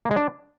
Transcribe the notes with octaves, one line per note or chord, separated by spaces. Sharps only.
A#3
G#3
D4